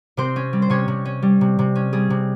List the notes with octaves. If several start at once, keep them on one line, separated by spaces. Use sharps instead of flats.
C3 C4 C5
C#4
G3
C5
C3 C#4 C#5
C3
C#4
G3
C3
C3
C#4
G3 G#4
C3